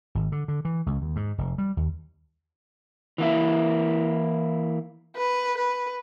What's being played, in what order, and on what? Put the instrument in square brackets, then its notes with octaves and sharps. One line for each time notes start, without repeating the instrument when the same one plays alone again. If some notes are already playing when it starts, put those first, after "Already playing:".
[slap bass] G#1
D3
D3
E3
C#2
D#2
G#2
F1
G3
D#2
[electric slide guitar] E3 A#3 E4
[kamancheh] B4
B4